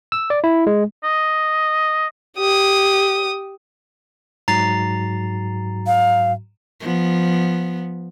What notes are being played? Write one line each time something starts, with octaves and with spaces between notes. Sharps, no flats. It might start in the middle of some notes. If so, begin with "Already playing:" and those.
E6
D5
E4
G#3
D#5
G4 D#6
G#2 F#3 F#4 A#5 A6 C7
F5
F3 B3